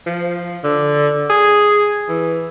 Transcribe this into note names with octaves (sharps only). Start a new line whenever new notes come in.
F3
D3
G#4
E3